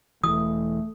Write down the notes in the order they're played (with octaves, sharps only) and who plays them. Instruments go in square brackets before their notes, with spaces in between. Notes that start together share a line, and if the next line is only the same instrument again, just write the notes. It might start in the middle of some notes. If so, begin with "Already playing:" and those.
[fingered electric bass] E1 E3 [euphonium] A3 [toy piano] D#6